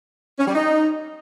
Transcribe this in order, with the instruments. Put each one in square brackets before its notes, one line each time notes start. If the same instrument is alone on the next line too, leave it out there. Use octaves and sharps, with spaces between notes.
[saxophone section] C#4
G3
D#4